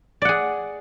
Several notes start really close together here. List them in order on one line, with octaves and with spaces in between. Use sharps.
D5 F#5 G#4